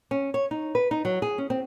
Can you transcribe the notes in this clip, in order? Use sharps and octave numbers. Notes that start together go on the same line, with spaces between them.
C#4
C#5
D#4
B4
D#4
F#3
G#4
C#4
C4